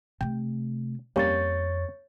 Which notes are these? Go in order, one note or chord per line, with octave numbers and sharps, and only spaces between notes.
C3 A3 G5
F2 G3 A#3 C#4 C#5 C#6 A6